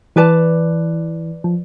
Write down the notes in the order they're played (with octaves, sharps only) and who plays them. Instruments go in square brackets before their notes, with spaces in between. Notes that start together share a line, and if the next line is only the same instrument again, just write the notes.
[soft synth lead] E3 [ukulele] B4 D5 A5
[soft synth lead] F3